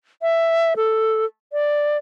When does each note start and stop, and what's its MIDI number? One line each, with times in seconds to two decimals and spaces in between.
0.22 0.74 76
0.76 1.25 69
1.53 1.97 74